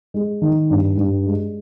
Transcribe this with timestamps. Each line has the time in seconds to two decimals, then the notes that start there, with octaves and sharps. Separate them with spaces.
0.14 G#3
0.42 D#3
0.70 G2
0.98 G2
1.26 G#3